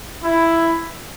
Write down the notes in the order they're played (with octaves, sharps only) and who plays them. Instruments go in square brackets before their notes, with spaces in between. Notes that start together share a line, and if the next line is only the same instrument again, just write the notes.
[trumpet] E4